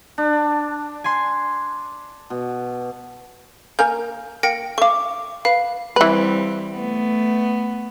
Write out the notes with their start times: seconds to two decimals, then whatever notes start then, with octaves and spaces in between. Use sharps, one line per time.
0.18 D4
1.04 G#5 C6
2.30 B2
3.79 A#3 A#4 G#5 G6
4.43 A#3 G5 A#6 C#7
4.78 A3 F5 C#6 D6
5.45 B4 F5
5.96 E3 G3 C4 B4
6.74 A3 B3